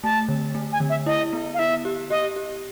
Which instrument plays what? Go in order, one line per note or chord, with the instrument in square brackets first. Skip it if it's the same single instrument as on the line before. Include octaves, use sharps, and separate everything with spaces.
[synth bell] A3 [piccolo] A5
[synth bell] D3
A3
[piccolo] G#5
[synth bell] D3
[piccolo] E5
[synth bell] E4 [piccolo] D#5
[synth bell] B3
[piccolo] F5
[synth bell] E4 [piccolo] E5
[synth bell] G4
[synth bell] G4 [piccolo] D#5
[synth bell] G4